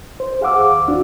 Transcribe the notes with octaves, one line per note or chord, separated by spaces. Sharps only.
C5
G#4 F5 F#5 D6 E6
D#2 D6
D4 F#4